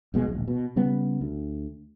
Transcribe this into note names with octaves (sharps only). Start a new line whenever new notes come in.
F1 B2 G#3
D1 A#1
B2
C#3 G3 B3
D2